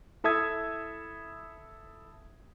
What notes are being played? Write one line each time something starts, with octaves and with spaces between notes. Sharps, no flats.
E4 A4 E5 D#6 G#6